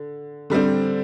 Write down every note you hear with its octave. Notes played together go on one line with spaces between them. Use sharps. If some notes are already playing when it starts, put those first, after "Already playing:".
Already playing: D3
D3 G3 C4